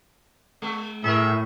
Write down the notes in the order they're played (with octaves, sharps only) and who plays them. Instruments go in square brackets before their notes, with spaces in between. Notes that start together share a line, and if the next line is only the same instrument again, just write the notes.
[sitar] G#3
[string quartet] A2 [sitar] G#4 A#4 [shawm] E5